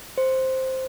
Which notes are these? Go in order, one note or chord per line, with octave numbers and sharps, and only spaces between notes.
C5